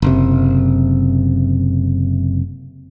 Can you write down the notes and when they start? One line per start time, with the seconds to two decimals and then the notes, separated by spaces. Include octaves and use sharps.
0.02 F#1 C3